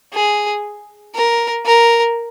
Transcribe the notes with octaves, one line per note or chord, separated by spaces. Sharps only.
G#4
A#4
A#4